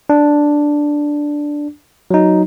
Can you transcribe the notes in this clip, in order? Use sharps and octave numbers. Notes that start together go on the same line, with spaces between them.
D4
F#3 D#4